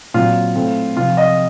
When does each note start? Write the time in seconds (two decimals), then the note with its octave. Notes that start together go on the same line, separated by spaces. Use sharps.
0.14 A#2 F#3 C4 F4
0.55 A2 A3 C4
0.96 C3 F3 C4 F4
1.17 D#5